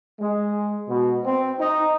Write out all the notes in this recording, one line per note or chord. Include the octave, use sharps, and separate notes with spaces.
G#3
B2
C4
D#4